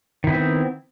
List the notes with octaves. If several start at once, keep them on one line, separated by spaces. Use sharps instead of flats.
D#3 B3 C4 E4